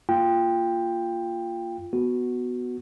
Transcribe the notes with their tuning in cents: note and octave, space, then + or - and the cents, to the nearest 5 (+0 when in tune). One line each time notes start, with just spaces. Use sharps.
A#3 +0 F4 -10 G5 +10
B3 +0 F#4 +0